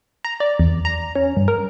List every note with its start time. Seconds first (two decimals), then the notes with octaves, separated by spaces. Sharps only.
0.25 A#5
0.40 D5
0.59 E2
0.85 A#5
1.15 C#4
1.36 G2
1.48 A#4